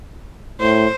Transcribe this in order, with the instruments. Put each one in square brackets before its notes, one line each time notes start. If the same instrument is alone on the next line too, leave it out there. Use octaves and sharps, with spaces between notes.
[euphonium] A2 [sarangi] C5